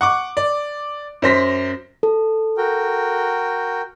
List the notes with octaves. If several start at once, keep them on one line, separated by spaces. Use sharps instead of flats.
F#5 C#6 D6
D5
F#2 C5 A#6 B6
A4
F#4 A#4 G5